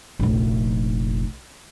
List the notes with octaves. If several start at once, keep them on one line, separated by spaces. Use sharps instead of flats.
F1 A#1